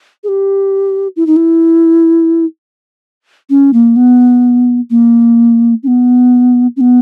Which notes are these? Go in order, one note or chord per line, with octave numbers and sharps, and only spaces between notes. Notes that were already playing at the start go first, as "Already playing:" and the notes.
G#4
G4
E4
D#4
E4
C#4
A#3
B3
A#3
C#4
B3
C#4
B3